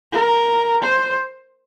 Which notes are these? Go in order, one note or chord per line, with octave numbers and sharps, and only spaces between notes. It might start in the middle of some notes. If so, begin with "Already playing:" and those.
A#4
C5